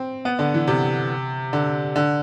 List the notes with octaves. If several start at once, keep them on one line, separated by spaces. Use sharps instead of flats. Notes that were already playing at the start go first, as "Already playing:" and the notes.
Already playing: C4
B3
D3
E3
C3
D3
D3